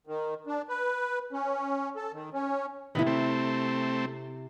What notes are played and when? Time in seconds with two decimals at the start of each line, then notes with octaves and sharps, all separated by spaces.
0.07 D#3
0.47 D4
0.69 B4
1.33 C#4
1.96 A4
2.13 D#3
2.33 C#4
2.95 C3 D#3 B3 E4
3.06 A3 C4